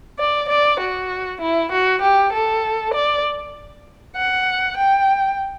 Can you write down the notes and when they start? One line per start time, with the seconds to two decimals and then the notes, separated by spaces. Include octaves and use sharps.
0.19 D5
0.49 D5
0.80 F#4
1.41 E4
1.72 F#4
2.02 G4
2.33 A4
2.94 D5
4.16 F#5
4.77 G5